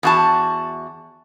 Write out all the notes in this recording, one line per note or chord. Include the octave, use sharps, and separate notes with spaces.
E2 F#4 A5